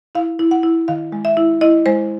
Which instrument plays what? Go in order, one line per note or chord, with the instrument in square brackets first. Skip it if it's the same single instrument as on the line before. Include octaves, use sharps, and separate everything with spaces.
[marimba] E4 F5
E4
F#5
E4
D#3 F5
G#3
E5
E4
E4 D#5
G#3 C5